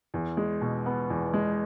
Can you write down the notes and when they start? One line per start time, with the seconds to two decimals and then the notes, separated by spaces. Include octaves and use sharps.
0.14 E2
0.37 G#3
0.61 B2
0.86 B3
1.10 E2
1.34 G#3